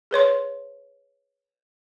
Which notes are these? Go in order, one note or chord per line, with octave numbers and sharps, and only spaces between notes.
G#4 B4 C#5 C6